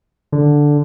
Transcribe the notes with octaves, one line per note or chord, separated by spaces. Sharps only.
D3